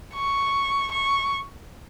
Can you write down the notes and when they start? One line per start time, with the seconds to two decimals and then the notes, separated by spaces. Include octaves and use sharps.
0.14 C#6
0.92 C#6